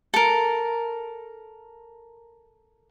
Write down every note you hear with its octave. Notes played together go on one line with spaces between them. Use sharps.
A4 A#4